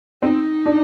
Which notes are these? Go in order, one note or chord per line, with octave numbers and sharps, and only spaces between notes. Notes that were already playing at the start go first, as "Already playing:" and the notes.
C4 D#4
D4